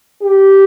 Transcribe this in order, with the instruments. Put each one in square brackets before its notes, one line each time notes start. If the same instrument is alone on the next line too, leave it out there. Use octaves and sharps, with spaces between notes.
[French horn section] G4